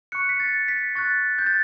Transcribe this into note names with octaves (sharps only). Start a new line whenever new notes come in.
C#6 F#6 C#7
B6
A6
B6
C#6 F#6 A6
G6
A6